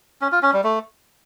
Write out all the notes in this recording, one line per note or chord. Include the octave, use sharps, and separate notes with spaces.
C#4
F4
C#4
G3
A3